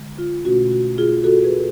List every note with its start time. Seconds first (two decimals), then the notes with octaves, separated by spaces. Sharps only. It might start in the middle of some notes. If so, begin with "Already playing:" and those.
Already playing: D3 G#3
0.18 F4
0.45 B2 A3 C#4 F#4
0.71 F#4
0.98 F4 G#4
1.24 F#4 A4
1.44 G#4 B4